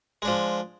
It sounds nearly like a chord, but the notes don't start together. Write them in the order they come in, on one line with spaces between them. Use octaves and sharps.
G#3 D4 F3